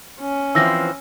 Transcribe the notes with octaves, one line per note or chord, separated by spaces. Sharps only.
C#4
E3 F3 C4 E6 A#6